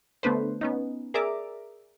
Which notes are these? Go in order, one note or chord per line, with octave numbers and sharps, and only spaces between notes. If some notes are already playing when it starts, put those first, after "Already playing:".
D3 A3 B3 D4 B4 C5
B3 C#4 D#4
G#4 A#4 D5 E5 A#5 D6